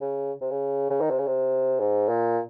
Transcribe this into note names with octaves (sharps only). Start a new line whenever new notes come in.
C#3
C3
C#3
C#3
D#3
C3
C#3
C3
G#2
A#2